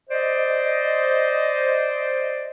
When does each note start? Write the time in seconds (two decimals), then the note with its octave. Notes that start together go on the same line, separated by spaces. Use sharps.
0.10 C5 D5 D#5